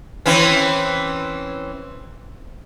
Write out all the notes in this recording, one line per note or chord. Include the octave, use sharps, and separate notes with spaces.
E3 C4 C#4